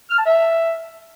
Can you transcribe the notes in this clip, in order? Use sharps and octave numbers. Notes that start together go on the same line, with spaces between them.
F6
A5
E5